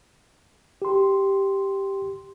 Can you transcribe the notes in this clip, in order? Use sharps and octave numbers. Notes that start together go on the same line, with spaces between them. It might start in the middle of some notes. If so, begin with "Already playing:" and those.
G4 C6